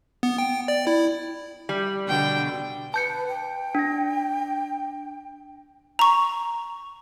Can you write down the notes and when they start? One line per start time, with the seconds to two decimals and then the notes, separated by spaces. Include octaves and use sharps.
0.23 B3
0.38 G5
0.68 D5
0.87 E4
1.69 G3
2.08 B2 D3 G5
2.94 B4 A5 G6 C#7
3.28 G5
3.75 D4 A#6
5.99 A#5 C#6